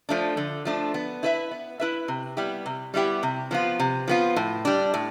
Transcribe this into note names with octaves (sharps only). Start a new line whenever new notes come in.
F3 A3 D4
D3
F3 A3 D4
B3
E4 B4 E5
B3
E4 B4 E5
C3
G3 B3 E4 G4
C3
G3 B3 E4 G4
C3
F3 B3 F4
C3
F3 B3 F4
A2
G3 D4
A2